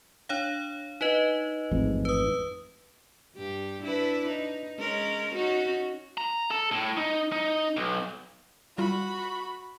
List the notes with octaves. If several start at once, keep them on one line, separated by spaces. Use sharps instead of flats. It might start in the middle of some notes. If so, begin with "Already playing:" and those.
D4 C#5 F5
D#4 B4 D#5
A1 F2 G#2
B4 D#6
G2 G4
D4 E4 B4
D#4
G#3 C#4 A#4
C#4 D#4 F#4
A#5
A4 A5
A2
D#4
D#4
B1
G3 F4 F#4 B5